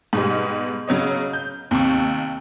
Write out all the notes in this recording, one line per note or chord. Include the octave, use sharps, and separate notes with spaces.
G#2 B2 G3
C#3 F#3 C#5 D#5
G6
D#2 C3 A5 C#6